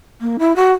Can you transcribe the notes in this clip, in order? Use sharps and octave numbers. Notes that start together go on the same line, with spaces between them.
A#3
E4
F#4